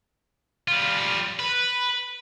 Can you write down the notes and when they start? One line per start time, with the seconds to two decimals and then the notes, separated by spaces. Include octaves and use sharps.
0.68 G3 F4
1.39 B4